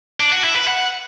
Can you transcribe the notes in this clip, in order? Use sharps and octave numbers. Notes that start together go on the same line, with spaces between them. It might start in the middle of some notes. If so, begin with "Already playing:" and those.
D4
F#4
E4
B4
F#5